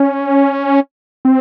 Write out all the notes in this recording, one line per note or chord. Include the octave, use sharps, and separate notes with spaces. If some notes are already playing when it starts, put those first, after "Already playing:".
Already playing: C#4
C4